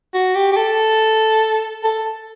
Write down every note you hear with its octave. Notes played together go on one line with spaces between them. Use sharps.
F#4
G4
G4
A4
A4